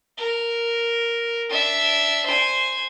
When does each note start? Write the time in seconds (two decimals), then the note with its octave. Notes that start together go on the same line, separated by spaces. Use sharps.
0.18 A#4
1.49 D4 E5
2.26 C5 G#5